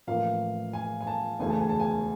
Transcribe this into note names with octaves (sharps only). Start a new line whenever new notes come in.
A1 A2 F3 A#3 F5
G#5
G#5
A5
E1 D2 C#3 E3 A3 G#5
A5
G#5
A5
G#5